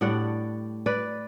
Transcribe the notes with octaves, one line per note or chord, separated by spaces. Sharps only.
A2 G3 D4 D5 F#5
B4 D5